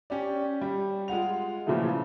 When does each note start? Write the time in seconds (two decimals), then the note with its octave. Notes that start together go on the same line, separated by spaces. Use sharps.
0.10 C#4 G4 D5
0.62 G3
1.08 G#3 F4 F#5 F7
1.67 A#2 C#3 E3 F3 G#3 A3